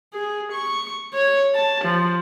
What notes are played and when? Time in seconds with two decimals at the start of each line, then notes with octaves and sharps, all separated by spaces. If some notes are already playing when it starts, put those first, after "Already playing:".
0.13 G#4
0.52 C#6
1.13 C#5
1.55 A5
1.84 F3